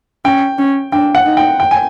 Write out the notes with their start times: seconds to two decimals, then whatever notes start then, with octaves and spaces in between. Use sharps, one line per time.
0.25 C#4 G5
0.58 C#4
0.92 D4 G5
1.15 F#5
1.26 D#4
1.37 G5
1.60 G5
1.71 G#5